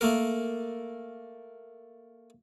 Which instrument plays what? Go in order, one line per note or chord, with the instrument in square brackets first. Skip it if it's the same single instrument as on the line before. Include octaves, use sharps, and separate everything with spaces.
[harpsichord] A3 A#3 A#4